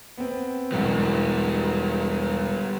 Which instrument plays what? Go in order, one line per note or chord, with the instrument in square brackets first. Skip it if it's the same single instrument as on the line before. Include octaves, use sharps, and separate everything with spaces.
[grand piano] B3 C4
[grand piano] E1 B1 E2 [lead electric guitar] G3 B3